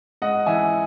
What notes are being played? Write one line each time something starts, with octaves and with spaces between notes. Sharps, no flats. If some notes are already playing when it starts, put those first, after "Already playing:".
G#2 D#5 F#5
E3 E5 G#5